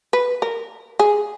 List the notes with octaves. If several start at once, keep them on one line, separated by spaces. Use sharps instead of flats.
B4
A#4
G#4